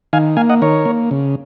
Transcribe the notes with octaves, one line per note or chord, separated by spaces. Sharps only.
D#3 F5 G#5
A#3 F5 G#5
D#5 F#5
D#3 A#4 C#5
A#3
C#3